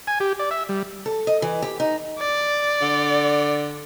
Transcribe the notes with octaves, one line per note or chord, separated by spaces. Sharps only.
G#5
G4
D5
E5
G3
A4
D#5
E3
G4
D#4
D5
D3